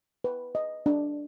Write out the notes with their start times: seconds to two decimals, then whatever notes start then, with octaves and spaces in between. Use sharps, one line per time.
0.24 B4
0.55 D#5
0.86 D4